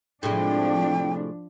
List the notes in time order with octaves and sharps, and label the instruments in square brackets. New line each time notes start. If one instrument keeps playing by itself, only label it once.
[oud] A2 C3 G#3 [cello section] F3 D4 [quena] G5